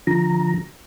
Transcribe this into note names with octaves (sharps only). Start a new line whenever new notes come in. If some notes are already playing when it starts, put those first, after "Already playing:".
D3 F3 A#5